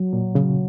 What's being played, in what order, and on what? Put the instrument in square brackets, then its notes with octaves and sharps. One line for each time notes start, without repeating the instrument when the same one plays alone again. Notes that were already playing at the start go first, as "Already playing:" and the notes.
Already playing: [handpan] F#3
[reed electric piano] A#2
[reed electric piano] C#3 [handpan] F#3